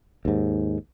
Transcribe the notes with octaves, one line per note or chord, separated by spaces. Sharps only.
D#2 G#2